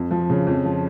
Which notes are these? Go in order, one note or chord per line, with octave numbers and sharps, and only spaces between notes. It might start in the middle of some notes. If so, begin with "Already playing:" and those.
Already playing: F2
F3
C#3
F2
F3